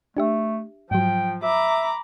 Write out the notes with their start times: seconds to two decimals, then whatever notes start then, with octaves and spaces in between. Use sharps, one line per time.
0.17 A3 D4 G4 E5
0.91 G#2 F3 F#3 G5
1.43 E5 A#5 B5 D6